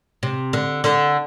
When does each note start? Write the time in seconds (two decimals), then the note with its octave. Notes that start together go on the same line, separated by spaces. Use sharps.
0.23 C3
0.53 D3
0.84 D3